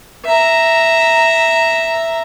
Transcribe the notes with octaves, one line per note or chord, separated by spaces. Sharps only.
E5 A#5